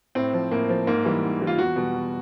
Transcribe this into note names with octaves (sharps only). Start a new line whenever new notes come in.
A2 C4
F3
A2 A#3
F3
G#2 A#3
E3 G3
G#2
E3 G3
F4
E2 F#4
B2 G3
E2